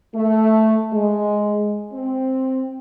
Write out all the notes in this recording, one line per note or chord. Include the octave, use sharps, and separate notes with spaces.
A3
G#3
C4